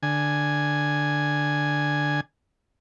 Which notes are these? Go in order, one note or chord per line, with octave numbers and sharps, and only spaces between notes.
D3 G#5